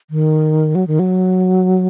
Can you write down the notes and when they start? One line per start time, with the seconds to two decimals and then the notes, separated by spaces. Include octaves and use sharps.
0.10 D#3
0.75 F#3
0.87 D#3
0.99 F#3